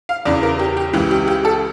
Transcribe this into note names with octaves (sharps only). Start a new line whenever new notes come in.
F5
E2 C#3 E3 D5
A#4
G4
G4
C#2 C#3 E3 G4
G4
G4
A4